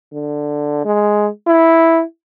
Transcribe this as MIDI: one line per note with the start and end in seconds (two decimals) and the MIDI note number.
0.13 0.83 50
0.85 1.28 56
1.47 2.02 64